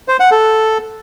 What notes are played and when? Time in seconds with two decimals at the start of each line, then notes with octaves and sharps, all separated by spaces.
0.08 C5
0.20 F#5
0.31 A4